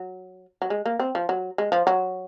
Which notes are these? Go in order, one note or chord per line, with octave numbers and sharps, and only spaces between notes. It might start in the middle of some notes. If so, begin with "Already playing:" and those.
Already playing: F#3
F#3
G#3
A#3
C4
F3
F#3
G#3
F3
F#3